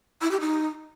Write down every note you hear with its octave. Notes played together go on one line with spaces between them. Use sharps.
E4
G4
D#4